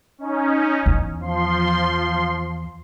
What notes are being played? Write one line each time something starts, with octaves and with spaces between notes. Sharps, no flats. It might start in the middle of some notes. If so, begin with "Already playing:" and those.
C#4 D#4
E2
F3 C6